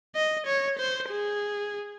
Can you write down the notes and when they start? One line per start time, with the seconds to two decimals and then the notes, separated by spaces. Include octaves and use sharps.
0.15 D#5
0.46 C#5
0.78 C5
1.10 G#4